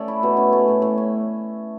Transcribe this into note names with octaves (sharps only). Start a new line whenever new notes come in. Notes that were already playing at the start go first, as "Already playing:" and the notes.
Already playing: A3 C#4 D5
E4
B2
C#4
A3
A2
A2
C#4